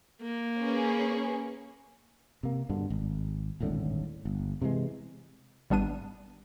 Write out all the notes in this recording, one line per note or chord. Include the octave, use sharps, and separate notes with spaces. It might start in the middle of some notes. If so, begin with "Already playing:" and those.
A#3
C#4 G#4 B4
C3 A#3
G2 B2 D3
G#1
D#1 G#1 A2 D3
G1
C3 E3 F#3 G#3
G#1 G3 B3 D4 D#7